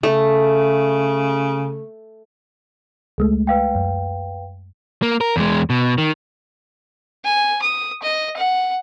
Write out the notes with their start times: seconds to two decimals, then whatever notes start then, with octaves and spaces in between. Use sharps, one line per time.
0.03 C#3 A3
3.18 C#2 G#3 A3
3.47 B4 F5 G5
3.75 F#2
5.03 A#3
5.21 A#4
5.36 E2 G#3
5.70 B2
5.98 D#3
7.24 G#5
7.62 D#6
8.03 D#5
8.37 F#5